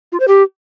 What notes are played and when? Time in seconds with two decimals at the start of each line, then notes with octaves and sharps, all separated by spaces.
0.12 F4
0.20 C5
0.28 G4